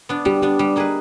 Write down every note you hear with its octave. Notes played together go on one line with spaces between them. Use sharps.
B3 D4
G3 G4
B3 D4 G4
G3
A#3 D#4 G#4 B4